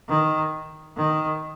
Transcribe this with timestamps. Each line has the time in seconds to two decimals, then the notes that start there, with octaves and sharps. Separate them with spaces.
0.09 D#3
0.96 D#3